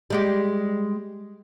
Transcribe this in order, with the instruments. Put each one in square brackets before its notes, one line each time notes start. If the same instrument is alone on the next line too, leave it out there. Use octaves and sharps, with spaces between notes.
[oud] G3 G#3 G4